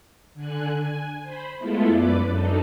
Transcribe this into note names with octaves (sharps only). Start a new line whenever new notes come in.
D3 G#5 F#6
G#5
C5 B5
G#3 A3 B3 E4 F4 A4
F#2 B4 D5 D6
F#2 D4 D#4 A4